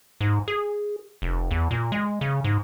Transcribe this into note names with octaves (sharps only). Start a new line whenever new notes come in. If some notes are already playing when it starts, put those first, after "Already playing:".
G#2
G#4
F1
E2
A#2
G#3
C#3
G#2